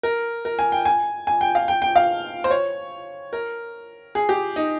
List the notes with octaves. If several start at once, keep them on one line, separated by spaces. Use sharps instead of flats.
A#4
A#4
G#5
G5
G#5
G#5
G5
F5
G5
G5
F5
C5
C#5
A#4
G#4
G4
D#4